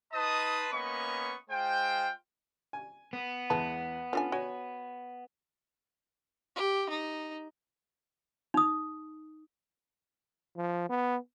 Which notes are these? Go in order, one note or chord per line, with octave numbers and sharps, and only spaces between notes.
D#4 B4 D#5 A5 C6 D#6
A#3 B3 C#4 D#5 B5 C#6
G#3 F4 C5 G5
G#5
B3
E2 G#3 B4 A5
C#4 D4 F4 A4 G#5
F#4 C#5 G#5
G4
D#4
D#4 D#6
F3
B3